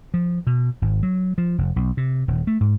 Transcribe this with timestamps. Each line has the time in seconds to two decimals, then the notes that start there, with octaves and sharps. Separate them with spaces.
0.14 F3
0.47 B2
0.82 G#1
1.03 F#3
1.38 F3
1.58 F1
1.76 B1
1.97 C3
2.28 D#1
2.47 A3
2.61 G#2